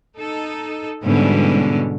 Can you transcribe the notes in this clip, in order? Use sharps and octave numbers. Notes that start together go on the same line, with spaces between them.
D#4 A4
G#2 B2 D3 E3 G3 C#4